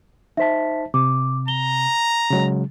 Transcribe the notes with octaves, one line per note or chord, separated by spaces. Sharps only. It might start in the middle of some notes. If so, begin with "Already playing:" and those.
D#4 C5 E5 A5 B6
C3 D6
A#5 G7
C#3 F#3 G#3